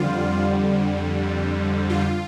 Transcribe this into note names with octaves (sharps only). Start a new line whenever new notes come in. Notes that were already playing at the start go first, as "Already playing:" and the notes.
Already playing: F2 D3 G3 F4
F4